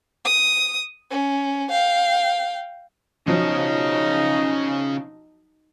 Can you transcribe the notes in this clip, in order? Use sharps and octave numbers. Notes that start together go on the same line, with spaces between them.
D#6
C#4
F5 G5
B1 C#3 F3 F#3 C#4 D#4